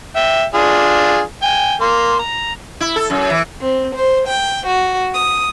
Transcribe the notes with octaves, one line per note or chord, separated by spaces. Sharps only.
E5 G5
D4 F4 G#4
G5 G#5
A#3 C6
A#5
E4
A4
F#2
E3
C4
C5
G5
F#4
D#6